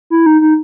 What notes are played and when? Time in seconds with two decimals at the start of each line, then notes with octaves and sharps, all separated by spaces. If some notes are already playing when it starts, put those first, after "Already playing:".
0.10 E4
0.26 D#4
0.41 D#4